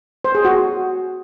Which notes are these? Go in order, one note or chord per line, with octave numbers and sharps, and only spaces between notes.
C5
G#4
F#4